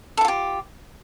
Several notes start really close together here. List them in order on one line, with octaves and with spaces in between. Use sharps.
A4 E4 F4 G4